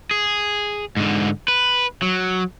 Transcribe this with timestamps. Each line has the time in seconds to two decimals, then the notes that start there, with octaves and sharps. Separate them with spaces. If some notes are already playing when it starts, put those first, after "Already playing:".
0.11 G#4
0.97 G#2 D3
1.48 B4
2.02 F#3